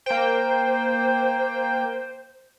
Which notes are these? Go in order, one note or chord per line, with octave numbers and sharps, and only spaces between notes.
A#3 C5 G5